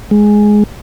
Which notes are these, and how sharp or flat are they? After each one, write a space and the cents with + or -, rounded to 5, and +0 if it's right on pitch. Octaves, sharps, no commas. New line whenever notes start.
G#3 +5